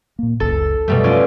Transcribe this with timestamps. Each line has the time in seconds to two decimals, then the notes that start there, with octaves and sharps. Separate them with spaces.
0.19 A#2 A#3
0.40 F#1 C#2 A4
0.88 F#2 B2 G3 A3
1.04 C#4 F4 D5